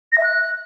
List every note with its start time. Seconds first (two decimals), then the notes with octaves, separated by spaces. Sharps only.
0.12 A#6
0.18 E5
0.23 F#6